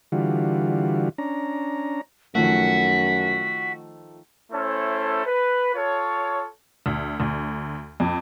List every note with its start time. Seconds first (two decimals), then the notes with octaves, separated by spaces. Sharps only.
0.12 D3 E3 G3 F4 F#4
1.18 C#4 D4 A#5
2.35 F#2 D#3 F3 A3 F#4 B6
4.52 A3 C#4 E4 A4 C5
5.25 B4
5.74 F4 A4 C#5
6.86 D2
7.20 D2
8.00 F2